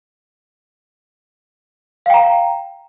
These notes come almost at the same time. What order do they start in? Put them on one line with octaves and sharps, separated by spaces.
F5 G5 A#5